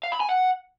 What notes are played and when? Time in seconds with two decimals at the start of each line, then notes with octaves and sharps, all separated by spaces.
0.03 F5
0.12 B5
0.20 G#5
0.29 F#5